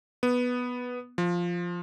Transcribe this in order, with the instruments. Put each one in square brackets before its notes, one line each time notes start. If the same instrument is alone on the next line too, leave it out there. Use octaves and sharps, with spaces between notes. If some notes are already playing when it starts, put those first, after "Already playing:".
[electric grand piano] B3
F3